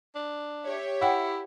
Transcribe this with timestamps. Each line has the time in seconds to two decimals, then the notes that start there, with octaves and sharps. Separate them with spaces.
0.15 D4
0.63 G4 C#5 E5
1.01 E4 F#5 G5